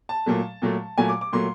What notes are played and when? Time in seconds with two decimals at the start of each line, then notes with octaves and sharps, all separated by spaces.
0.09 A5
0.26 A#2 F#3 A3
0.62 A#2 F#3 A3
0.98 A#2 F#3 A3 G#5
1.09 D6
1.21 D6
1.33 A#2 F#3 A3 C6